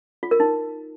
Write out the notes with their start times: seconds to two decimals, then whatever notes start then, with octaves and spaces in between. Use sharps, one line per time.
0.23 F4
0.31 A#4
0.40 D#4